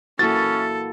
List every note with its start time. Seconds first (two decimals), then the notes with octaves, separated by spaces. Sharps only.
0.19 A#3 C#4 E4 F#4 A4 A6